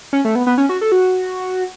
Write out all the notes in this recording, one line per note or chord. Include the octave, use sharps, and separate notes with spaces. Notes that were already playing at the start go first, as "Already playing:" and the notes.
C#4
A3
B3
B3
C#4
F#4
A4
F#4